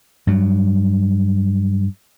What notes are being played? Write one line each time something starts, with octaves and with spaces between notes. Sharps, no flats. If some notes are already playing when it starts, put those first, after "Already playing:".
G2 F#3